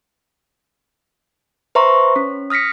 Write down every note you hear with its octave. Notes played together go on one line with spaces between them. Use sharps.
B4 C5 E5 A#5 C6 C#6
C#4
D#6 F6 A#6 B6 C#7